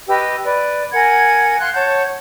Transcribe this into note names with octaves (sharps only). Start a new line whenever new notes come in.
G4 B4 D#5 E6
B4 D5
A#4 F#5 G#5 G#6
F5 C6 F6 F#6
C#5 F#5 A5 G6